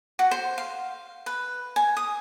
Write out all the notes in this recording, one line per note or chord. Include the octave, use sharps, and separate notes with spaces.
F#4
C5
F5
B4
G#5
D#6